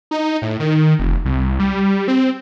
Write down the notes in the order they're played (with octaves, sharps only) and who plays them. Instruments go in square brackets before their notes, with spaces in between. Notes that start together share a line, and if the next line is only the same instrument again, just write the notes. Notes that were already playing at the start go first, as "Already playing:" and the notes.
[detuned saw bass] D#4
A2
D#3
F1
C2
G3
C4